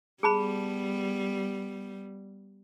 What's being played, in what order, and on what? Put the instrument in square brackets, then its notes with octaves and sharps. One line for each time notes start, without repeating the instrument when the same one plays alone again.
[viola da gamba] G3 B3 [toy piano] G#4 A5 B5